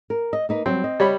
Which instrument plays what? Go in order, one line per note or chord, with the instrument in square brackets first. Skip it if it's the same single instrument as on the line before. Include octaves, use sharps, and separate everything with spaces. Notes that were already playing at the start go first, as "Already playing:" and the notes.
[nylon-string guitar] A#4
D#5
A#3 D#4 B4
[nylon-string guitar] F#3 G3 [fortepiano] C4
[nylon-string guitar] D#5
[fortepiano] G3 C#5 B5